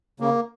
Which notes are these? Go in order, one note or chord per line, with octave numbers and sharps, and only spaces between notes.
C#3 A#3